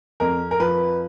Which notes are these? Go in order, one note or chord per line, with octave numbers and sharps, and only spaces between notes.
F2 A#4
A#4
F3 B4